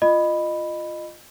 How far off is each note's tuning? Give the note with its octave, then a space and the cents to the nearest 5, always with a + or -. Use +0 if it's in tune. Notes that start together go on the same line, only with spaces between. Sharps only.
F4 -10 D#5 -20 B5 +0